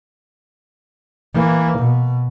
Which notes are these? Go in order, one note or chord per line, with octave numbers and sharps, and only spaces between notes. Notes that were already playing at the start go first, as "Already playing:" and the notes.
E3 A#3
B2